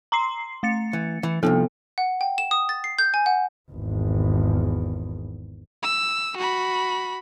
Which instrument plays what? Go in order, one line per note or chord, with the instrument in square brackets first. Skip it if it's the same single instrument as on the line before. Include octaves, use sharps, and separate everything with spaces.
[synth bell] A#5 C6 C7
A3 A6 C#7
[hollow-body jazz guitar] E3
E3
[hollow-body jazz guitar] C2 G2 F3 [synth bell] B3 A4
[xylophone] F#5
G5
E7
D#6
A6
C7
G6
G#5
F#5
[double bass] G#1 E2
[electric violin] E6
F#4 B5